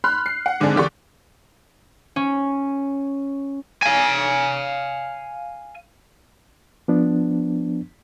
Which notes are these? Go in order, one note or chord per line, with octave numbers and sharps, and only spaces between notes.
B5 C6 F6 F#6
C7
F#5
G#2 D3 G#3 C4 D4 G#4
E2 D3 G4 D5 C#6
C#4
F5 G#5
F3 B3 D4